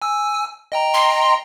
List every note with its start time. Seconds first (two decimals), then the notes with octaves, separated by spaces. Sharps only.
0.02 G#5 E6
0.72 D#5 G5 A#5
0.94 C6